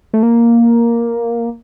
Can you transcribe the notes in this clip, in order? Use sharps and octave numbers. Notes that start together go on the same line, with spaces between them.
A3
A#3